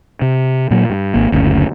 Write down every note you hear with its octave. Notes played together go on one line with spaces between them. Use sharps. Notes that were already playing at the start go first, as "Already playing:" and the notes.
C3
A#2 F#3
G2
G#1 A#3
F#1 D2 A2 C#3